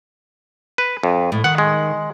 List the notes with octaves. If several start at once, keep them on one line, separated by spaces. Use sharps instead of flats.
B4
F2
A2
D#3 F#5
G#3